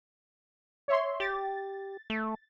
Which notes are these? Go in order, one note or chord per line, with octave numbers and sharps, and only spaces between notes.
C#5 E5 C6
G4 A6
A3